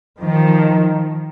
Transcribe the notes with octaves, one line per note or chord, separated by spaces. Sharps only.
D#3 F3